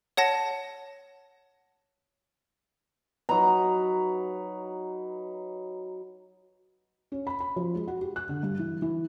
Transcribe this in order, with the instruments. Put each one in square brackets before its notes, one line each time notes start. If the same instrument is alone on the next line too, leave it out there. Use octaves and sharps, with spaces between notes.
[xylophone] C#5 F#5 A5 A#6
[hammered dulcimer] F#3 D#4 B4 A#5
[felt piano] C#4
B5
B5
F3
G#3
F#4
G4
F#6
D3
G2
E3
E3